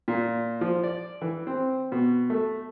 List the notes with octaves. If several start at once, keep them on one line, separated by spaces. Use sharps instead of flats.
A#2
F3
D5
E3
C4
B2
A3